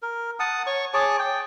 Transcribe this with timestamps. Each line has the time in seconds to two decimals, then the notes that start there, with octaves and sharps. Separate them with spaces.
0.02 A#4
0.40 F#5 A5 D#6
0.67 C#5 C#6
0.94 G#4 C#5 A5 D6
1.19 G5